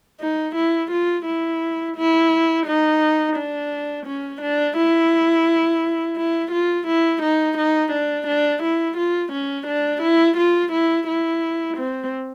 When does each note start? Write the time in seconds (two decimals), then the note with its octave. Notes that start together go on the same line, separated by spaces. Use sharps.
0.21 D#4
0.56 E4
0.91 F4
1.26 E4
1.97 E4
2.66 D#4
3.36 D4
4.06 C#4
4.42 D4
4.77 E4
6.17 E4
6.51 F4
6.87 E4
7.22 D#4
7.58 D#4
7.92 D4
8.27 D4
8.63 E4
8.97 F4
9.32 C#4
9.67 D4
10.02 E4
10.37 F4
10.72 E4
11.08 E4
11.77 C4